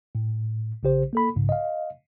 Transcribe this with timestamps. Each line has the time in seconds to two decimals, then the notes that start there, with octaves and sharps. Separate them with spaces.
0.15 A2
0.83 A#1 C#3 G4 C5
1.13 A#3 A4 B5
1.36 B1 G#2 C#3
1.49 D#5 F5